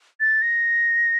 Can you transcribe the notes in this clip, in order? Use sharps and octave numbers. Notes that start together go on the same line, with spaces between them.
A6
A#6